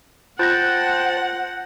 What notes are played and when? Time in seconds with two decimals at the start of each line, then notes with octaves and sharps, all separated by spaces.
0.39 F4 C5 F#5 G5 A5 F#6 G6 A#6